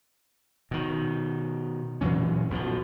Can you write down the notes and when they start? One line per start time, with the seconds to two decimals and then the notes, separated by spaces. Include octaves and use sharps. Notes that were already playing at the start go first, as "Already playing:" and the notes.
0.71 B2 D#3
2.01 A#2 E3 F#3 C#4
2.50 B1 B2 D3 F3